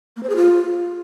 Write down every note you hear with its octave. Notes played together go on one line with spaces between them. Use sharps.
A#3
C5
G#4
F4